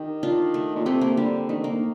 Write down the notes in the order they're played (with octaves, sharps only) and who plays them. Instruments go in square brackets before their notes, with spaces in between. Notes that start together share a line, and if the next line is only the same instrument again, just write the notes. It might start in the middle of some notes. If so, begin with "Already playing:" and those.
Already playing: [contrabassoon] D#3 [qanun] D#4 G4
[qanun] D4 F4
A3
[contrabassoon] A#2
[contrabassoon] C3 [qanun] A3 C4
[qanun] A#3
[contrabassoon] D3 [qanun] G3
[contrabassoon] D#3 [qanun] A3
[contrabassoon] D3 [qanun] A#3
[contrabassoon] D#3